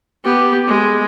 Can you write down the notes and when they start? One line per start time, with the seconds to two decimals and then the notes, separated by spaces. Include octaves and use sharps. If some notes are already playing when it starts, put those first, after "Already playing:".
0.24 B3 G4
0.67 G#3